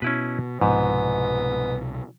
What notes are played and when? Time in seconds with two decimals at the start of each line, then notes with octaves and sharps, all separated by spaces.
0.02 B2 C#4 E4 B4
0.61 C2 G#2 B2 F3 B3